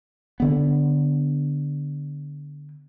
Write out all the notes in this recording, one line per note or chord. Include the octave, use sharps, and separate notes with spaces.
D3 B3